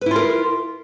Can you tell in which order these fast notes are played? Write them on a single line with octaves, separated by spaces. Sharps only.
B4 E4 F4 A#4